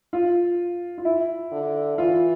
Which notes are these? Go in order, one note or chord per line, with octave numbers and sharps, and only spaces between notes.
F4
F4
E4
D3
E3 F4